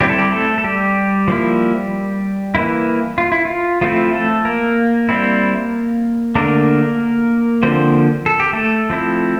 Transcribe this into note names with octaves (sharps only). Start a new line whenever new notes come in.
G3 C4 E4 G4
A4
G3 G4
A3 A4
A4
G3 G4
F3 A#3 E4
E3 A#3 E4
F4
E4
F4
F3 A3 C4 E4 F4
A3 A4
A#3 A#4
G3 C4 E4
D3 A3 A#3 D4 A#4
D3 F3 A#3 C4 C5
A4
G4
A3 A4
F3 C4 E4